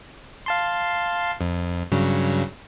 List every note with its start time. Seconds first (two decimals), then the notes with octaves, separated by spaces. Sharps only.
0.46 F5 A5 C6
1.41 F2
1.92 G2 C#3 F#3